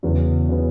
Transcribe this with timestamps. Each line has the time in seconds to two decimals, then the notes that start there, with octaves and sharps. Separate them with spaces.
0.03 E2 C#3 F#3 B3
0.49 C#3 F#3 B3